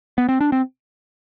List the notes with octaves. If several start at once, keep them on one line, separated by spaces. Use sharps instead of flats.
B3
C4
D4
C4